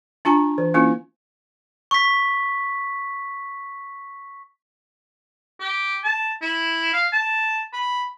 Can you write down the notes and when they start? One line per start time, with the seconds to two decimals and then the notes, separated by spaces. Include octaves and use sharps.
0.25 D4 F4 G#5 A#5
0.58 E3
0.74 A#3 C#4 E4 F4
1.91 C#6 B6
5.60 G4
6.04 A5
6.42 E4
6.93 F5
7.13 A5
7.73 B5